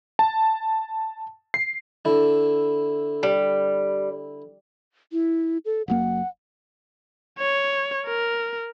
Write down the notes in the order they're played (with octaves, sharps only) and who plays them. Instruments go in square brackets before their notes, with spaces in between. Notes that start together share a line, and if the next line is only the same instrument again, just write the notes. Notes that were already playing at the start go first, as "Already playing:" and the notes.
[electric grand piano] A5
C7
[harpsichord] D3 E4
[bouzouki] G3
[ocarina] E4
A4
[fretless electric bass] F#1 F#2 A#3 [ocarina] F#5
[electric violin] C#5
A#4